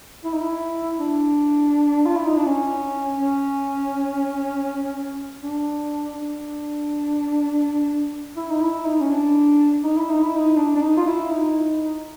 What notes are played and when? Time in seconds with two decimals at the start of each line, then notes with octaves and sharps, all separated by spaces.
0.24 E4
0.33 D#4
0.41 E4
0.99 D4
2.06 F4
2.16 E4
2.26 D#4
2.36 D4
2.46 C#4
3.20 C#4
5.42 D4
6.14 D4
8.36 E4
8.51 D#4
8.61 E4
8.86 D#4
9.01 C#4
9.10 D4
9.84 D#4
9.97 E4
10.10 D#4
10.23 E4
10.36 D#4
10.57 D4
10.76 D4
10.82 D#4
10.97 F4
11.07 E4
11.31 D#4